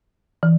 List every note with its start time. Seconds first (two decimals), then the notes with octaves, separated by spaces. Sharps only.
0.43 E3